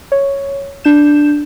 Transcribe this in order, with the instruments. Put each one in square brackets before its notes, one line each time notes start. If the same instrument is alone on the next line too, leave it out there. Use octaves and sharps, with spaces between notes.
[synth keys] C#5
D4 G6 E7